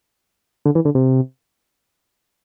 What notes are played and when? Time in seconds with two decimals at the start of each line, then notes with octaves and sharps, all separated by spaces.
0.66 D3
0.75 E3
0.85 D3
0.95 C3